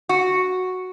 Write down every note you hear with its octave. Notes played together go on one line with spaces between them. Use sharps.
F#4